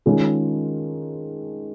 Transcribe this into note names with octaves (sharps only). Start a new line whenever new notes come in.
D#3 G#3 C#4 F4 G#4